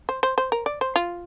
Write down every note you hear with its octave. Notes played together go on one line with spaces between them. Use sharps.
C5
C5
C5
A#4
D5
C5
F4